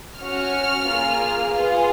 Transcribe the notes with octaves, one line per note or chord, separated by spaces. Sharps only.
C#4 F#4 F6
A#3 F4 G#4
B3 F4 G#4